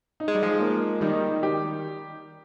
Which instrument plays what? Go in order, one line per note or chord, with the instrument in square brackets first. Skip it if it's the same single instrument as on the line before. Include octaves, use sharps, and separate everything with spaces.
[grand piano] D#4
[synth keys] G#3
G3
F3 G#3
[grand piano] A#3
[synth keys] D#3 G3 [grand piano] D#4
[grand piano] G4